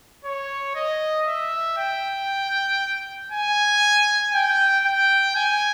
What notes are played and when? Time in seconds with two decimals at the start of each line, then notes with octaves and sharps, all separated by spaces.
0.25 C#5
0.75 D#5
1.26 E5
1.77 G5
3.32 G#5
4.34 G5
4.85 G5
5.36 G#5